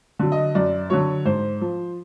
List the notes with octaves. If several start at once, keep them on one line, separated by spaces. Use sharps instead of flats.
D3 F#3
D#5
F#2 D5
D3 F#3 C#5
G#2 C5
F3